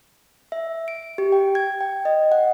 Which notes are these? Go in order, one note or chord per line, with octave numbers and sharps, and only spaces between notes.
E5
D7
G4
G5
G#6
G5
D#5
F#5